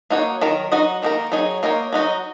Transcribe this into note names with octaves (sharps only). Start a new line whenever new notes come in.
A#3 D#4 F#4 C#5
D#3 F#3 A#4
F#3 D#4 F#4 D#5
D#3 A#3 D#4 A#4
F#3 D#4 G#4 C#5
A#3 D#4 A#4 C#5
F#3 D#4 F#4 D#5